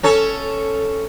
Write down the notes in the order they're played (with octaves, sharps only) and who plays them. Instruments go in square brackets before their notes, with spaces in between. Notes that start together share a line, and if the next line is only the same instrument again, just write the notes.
[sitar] C#4 A4 C#5